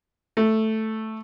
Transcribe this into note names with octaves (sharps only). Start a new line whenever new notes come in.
A3